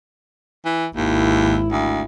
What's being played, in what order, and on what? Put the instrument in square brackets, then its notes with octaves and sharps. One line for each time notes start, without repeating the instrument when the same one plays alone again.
[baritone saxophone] E3
[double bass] G#1 E4 [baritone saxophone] D#2
[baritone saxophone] D2